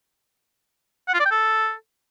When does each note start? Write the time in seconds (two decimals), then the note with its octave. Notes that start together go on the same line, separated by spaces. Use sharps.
1.08 F#5
1.14 F4
1.20 D5
1.26 G5
1.31 A4